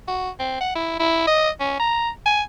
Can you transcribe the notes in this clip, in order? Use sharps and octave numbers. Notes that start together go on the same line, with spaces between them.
F#4
C4
F#5
E4
E4
D#5
C#4
A#5
G#5